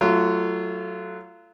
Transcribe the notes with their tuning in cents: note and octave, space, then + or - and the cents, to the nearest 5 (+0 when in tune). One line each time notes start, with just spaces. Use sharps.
F#3 +0 A3 +0 F4 -25